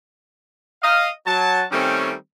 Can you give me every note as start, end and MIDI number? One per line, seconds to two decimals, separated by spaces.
0.82 1.10 75
0.82 1.10 77
1.27 1.64 54
1.27 1.64 81
1.72 2.13 51
1.72 2.13 55
1.72 2.13 57
1.72 2.13 60
1.72 2.13 61